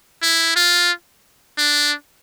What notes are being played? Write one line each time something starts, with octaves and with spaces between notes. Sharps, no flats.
E4
F4
D4